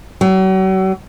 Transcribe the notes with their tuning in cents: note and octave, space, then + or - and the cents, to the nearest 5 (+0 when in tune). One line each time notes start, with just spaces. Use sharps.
F#3 +40